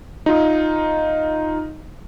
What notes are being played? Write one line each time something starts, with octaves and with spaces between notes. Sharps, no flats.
D#4 F4